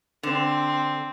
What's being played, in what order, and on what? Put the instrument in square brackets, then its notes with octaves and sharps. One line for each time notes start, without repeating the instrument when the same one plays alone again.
[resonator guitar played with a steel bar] D3 [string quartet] C4